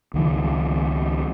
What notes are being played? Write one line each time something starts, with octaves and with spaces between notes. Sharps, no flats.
C#2 D#3 F3